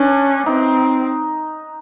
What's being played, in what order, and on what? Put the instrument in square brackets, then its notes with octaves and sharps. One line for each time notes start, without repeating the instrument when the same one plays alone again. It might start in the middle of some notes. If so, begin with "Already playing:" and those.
Already playing: [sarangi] C#4 [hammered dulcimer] D4
[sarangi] C4 [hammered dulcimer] D#4